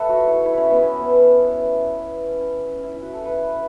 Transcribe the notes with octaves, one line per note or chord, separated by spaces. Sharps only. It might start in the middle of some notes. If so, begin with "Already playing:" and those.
Already playing: A4 B4 C#5 E5
F#4
E4
E4
C#4
B3
C#4
B3
C#4
C#4
C#4
E4
E4
F#4
A4
B4